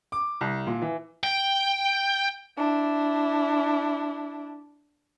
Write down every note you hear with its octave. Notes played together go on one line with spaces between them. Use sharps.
D6
C2
A#2
E3
G5
D4 E4